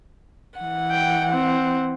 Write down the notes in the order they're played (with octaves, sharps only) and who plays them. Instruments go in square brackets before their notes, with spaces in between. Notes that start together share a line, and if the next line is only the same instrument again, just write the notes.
[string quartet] E3 F#5
[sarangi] G5
C4